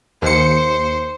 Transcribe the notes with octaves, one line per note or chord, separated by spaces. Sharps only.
D#2 C5 C#7